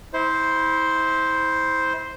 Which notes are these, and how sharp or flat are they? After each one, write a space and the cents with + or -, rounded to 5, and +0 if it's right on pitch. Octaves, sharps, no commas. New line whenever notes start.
E4 -30 C5 +0